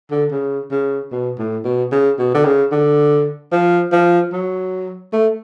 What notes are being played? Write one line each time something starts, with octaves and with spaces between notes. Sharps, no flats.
D3
C#3
C#3
B2
A2
B2
C#3
B2
D3
C#3
D3
F3
F3
F#3
A3